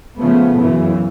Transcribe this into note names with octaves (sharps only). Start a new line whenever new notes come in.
C#3 F3 A3 B3
F#2 C#3 E3